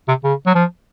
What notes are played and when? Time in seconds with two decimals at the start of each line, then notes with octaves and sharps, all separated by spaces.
0.08 C3
0.24 C#3
0.47 F#3
0.55 F3